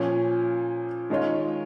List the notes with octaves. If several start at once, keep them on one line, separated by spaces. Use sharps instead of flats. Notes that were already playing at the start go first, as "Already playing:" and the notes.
Already playing: A#2 F3 C#4
D#3 G#3 C#4 F4